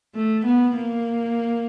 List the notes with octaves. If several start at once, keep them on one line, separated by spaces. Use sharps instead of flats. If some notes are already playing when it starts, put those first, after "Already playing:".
A3
B3
A#3